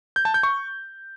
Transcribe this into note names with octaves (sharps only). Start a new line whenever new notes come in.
G6
A5
G6
C#6